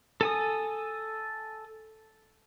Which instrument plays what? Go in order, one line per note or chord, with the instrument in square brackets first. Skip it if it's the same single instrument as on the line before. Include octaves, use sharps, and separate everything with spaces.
[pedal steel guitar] A4 G#5 D#6